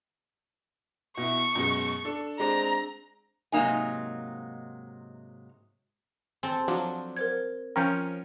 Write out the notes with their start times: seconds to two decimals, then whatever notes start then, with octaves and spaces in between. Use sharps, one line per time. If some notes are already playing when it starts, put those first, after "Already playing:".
1.17 B2 E4 C#6
1.55 F#2 B2 G#3
2.05 D4 A4
2.39 G#3 C4 D4 A#5
3.52 G#2 C3 F#3 A#3 D#4 G#5
6.43 C4 A4 G#5
6.68 F3 F#3 D4
7.16 A#4 C5 G#6
7.76 F3 C#4 A#4 G5 G6